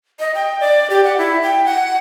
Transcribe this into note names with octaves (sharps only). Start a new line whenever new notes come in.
D#5
G5
D5
G4
F#5
E4
G5
F#5